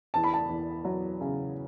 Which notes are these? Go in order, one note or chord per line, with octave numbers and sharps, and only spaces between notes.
E2 A5
B5
A5
E2
F#3
C#3